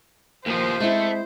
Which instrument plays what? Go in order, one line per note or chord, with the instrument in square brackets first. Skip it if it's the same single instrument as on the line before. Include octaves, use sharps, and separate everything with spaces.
[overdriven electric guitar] D#2 F3 [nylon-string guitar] A#3 [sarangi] C5
[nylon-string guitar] G#3 C4 E4 [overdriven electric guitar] A3